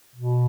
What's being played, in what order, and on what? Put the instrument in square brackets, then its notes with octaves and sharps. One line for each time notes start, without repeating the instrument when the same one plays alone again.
[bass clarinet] B2